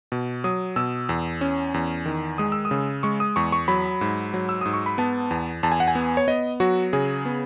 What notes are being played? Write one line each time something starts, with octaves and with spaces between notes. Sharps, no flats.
B2
F#3 D#6
B2 E6
E2
C#4
E2
D#3
G#3 D#6
E6
D#6
C#3
G#3 C#6
D#6
E2 C#6
C#6
F#3 B5
G#2
F#3
E6
G#2 D#6
C#6
B5
B3 A5
E2
E2 A5
G#5
F#5
G#5
B3
C#5
B3 D#5
F#3 F#4
C#3 G#4
B3